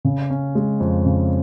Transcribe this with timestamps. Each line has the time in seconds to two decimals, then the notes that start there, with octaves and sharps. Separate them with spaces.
0.05 C#3
0.30 C#4
0.55 G#3
0.80 F2
1.06 C#3